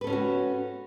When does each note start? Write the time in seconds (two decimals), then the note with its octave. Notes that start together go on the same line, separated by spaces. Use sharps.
0.01 B4
0.04 A4
0.07 C#4
0.10 F4
0.13 F#4